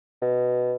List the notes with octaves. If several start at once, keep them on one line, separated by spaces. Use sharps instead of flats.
B2